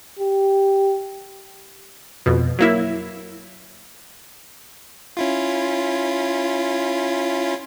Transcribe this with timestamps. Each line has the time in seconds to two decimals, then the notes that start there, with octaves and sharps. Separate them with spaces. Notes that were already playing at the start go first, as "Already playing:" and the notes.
0.19 G4
2.26 F2 B2
2.59 F#3 A#3 E4
5.17 C#4 E4 F4